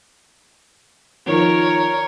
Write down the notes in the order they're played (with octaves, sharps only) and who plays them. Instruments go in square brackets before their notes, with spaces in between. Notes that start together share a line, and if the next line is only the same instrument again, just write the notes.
[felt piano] D#3 F3 [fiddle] A#4 C#5